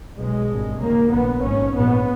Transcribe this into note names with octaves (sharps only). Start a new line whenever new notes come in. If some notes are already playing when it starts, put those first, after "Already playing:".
B1 B2 G#3
G#1 G2
D#2 C#3 A#3
A#1 A#2 B3
G#1 G#2 C#4
A#1 G#2 B3